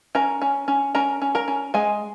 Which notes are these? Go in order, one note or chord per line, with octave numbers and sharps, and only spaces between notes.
C#4 A#4 A#5
C#4
C#4
C#4 A#4 A#5
C#4
A#4 A#5
C#4
G#3 G#4 G#5